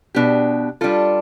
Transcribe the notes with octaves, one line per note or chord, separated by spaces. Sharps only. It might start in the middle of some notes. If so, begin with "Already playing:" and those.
B2 B3 D4 G4
G3 D4 F4 A4